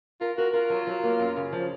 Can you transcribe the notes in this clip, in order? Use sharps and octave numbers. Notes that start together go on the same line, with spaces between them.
F4 A#4
F#4 A#4
F4 A#4
F#3
F#3
A#3
F#2
C#3
F3